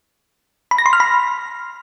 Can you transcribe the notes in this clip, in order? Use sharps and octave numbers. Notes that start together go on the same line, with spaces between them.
B5
A#6
C6
F6
B5